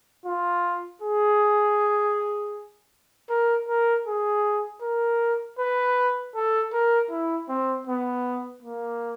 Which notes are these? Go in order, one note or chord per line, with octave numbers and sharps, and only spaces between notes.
F4
G#4
A#4
A#4
G#4
A#4
B4
A4
A#4
E4
C4
B3
A#3